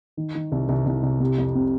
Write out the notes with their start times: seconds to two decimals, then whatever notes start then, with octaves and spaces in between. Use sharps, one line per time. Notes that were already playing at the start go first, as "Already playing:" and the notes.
0.17 D#3
0.35 D#3
0.52 C2
0.69 C2
0.86 C2
1.03 C2
1.20 C3
1.38 F2
1.55 C3